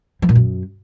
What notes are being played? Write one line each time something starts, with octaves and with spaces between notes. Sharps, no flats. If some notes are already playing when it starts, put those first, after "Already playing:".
F3
A#2
F#2